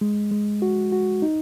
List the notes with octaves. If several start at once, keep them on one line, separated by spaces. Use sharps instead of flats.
G#3
G#3
F#4
F#4
D#4